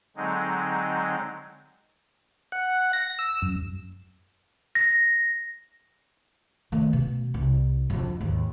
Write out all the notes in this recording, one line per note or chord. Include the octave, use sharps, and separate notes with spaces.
D3 F#3 G#3 C4 D#4
F#5
A#6
E6
F#2
A#6
D#3 A3
B2
C2
F2 D3
D#2 G#2